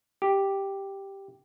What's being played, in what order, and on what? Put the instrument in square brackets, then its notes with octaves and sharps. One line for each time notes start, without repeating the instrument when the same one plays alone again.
[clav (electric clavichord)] G4